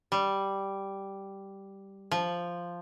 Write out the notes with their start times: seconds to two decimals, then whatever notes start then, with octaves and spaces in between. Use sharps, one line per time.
0.12 G3
2.11 F3